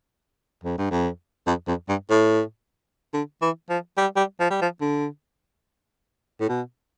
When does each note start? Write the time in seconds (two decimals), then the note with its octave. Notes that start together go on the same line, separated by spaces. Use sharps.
0.63 F2
0.78 G2
0.91 F2
1.47 F2
1.68 F2
1.89 G2
2.10 A2
3.14 D3
3.42 E3
3.69 F3
3.97 G3
4.16 G3
4.40 F3
4.50 G3
4.62 F3
4.81 D3
6.41 A2
6.49 B2